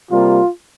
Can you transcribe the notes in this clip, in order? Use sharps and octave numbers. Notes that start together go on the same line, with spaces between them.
C3 G3 A#3 F4